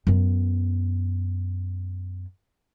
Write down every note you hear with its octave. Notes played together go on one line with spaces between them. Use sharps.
F#2 B3